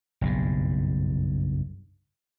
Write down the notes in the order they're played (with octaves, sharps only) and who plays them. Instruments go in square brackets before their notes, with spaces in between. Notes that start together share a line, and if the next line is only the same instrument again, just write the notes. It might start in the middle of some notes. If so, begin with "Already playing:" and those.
[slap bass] F#1 B1 G2